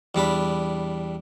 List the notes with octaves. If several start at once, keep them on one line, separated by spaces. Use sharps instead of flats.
E2 G3 D4 B5